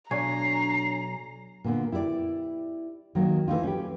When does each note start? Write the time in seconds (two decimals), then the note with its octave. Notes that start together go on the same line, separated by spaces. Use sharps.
0.11 B1 D4 C#5 G#5 A#5 C7
1.64 A#2 D3 B3
1.92 E4 G4 A#4 D5
3.15 D#3 F#3 A#3
3.48 E3 A3 D#4 F4
3.63 C#4 G4